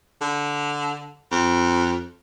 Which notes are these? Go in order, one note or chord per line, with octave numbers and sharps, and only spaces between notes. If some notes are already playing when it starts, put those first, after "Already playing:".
D3
F2